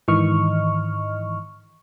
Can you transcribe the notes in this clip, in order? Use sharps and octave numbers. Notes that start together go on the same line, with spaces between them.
G#2 D#3 E3 D#5 C#6 F6